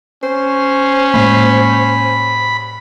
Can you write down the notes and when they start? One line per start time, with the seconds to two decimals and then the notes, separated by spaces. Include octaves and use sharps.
0.23 C#4 C5
1.14 A2 G#3 A#3 B5